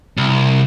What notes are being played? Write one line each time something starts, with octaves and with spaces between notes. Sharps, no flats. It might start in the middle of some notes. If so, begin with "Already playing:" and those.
C2